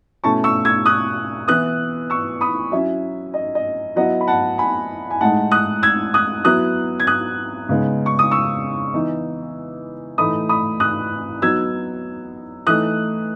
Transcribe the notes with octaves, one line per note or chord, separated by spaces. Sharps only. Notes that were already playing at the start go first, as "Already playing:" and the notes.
B2 A3 C#4 E4 A5 C#6
C#6 E6
E6 G#6
D#6 F#6
E3 B3 E4 D#6 F#6
C#6 E6
B5 D#6
F#3 C#4 E4 E5
D#5
D#5
F#3 B3 E4 D#5 F#5
B5
F#5 A5
G#5 B5
G#5
A2 G#3 D#4 F#5 A5
D#6 F#6
E6 G#6
D#6 F#6
F#3 B3 E4 D#6 F#6
G#6
D#6 F#6
C#3 G#3 B3 D#4
C#6
D#6
C#6 E6
E3 B3 D#4
A2 E3 A3 D#4 B5 D#6
B5 D#6
D#6 F#6
F#3 B3 D#4 E6 G#6
E3 A3 D#4 D#6 F#6